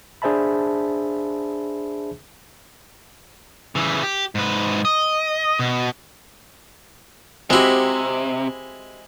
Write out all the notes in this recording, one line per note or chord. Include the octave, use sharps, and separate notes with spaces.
D4 G#4 C5 E5 A5 B5
C#3 E3
G4
G#2 B4
D#5
B2
C3 G#3 C4 E4 F#4 G4